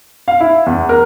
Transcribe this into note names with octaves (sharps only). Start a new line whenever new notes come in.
F5
E4
E2
A#4